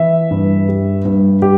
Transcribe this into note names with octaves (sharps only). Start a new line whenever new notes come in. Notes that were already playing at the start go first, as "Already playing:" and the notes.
Already playing: E3 E5
G2
G3
G2
G3 G4